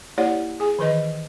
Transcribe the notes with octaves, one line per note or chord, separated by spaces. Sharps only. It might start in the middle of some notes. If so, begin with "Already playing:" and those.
A#3 E4 G4 C#5 D5 F#5
G#4 G#5
D#3 E3 B4 D#5